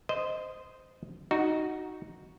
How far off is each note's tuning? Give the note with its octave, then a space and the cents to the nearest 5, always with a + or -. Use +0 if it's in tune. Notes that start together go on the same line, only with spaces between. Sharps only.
C5 -15 D#5 +0
D#4 +0 F#4 +0